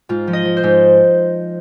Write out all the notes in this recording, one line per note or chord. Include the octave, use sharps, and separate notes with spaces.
G#2 F4
F3
D#5
F3
C5
G#2